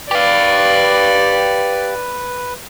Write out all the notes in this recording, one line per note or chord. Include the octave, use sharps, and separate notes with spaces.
G4 B4 D5 F5